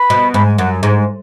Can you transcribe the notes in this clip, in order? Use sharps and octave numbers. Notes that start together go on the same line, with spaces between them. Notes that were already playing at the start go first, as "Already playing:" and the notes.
Already playing: B4
B2
G#2 B5
G#5
F#2 F#5
G#2